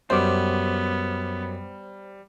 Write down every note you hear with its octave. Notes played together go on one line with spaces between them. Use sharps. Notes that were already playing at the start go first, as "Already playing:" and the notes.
F#2 G3 B3 C5 D6